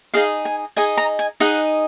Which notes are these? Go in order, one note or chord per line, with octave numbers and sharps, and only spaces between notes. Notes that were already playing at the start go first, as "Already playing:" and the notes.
D#4 G#4 D#5 F5
G#5
D#4 G#4 D#5 G#5
A#5
G#5
D#4 G#4 D#5 F#5